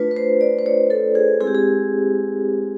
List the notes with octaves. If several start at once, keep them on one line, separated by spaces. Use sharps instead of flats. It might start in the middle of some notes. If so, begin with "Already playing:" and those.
Already playing: A3 D4 F4 B4
B4
C5
D5
C5
C#5
A4
G#4
G#3 C4 E4 G#4
G4
G#4